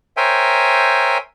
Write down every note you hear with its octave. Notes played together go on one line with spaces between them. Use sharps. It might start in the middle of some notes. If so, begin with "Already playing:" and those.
A#4 C5 C#5 E5 G5 G#5